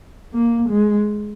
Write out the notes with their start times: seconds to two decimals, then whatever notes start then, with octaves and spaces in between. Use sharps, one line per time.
0.33 A#3
0.69 G#3